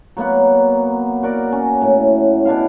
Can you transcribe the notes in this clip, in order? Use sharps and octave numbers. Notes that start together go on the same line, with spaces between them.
F#3 A#3 B3 F#5
F#4 A#4 D5
C#4
A2
B2 D4 E4 F5